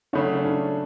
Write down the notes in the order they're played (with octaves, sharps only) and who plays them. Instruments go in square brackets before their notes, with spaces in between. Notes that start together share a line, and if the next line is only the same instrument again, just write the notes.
[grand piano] C#3 F#3 A3 C#4 F#4 [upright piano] D4
[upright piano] D4